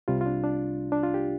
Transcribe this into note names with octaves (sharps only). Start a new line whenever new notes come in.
C2 C3 G3 F4
F4
D4
D4
D4
F4
G4